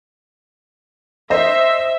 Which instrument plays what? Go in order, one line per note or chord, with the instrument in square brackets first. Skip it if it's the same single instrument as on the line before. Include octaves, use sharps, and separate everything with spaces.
[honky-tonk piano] C5 D#5 [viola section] E5